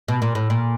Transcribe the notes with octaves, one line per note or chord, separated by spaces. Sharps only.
B2
A#2
A2
A#2